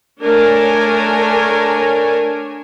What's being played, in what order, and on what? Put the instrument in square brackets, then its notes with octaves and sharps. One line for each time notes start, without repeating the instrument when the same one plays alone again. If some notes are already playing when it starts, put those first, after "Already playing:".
[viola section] A3 D4 A#4 C#5 G#5